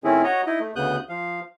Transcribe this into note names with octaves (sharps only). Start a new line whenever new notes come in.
A2 D#3 C4 C#4 E4 G#4
F#4 C#5 D#5 A#5
D#4 E4 D#5
A3
D2 C#3 B3 D#6 F#6 G6
F3 F5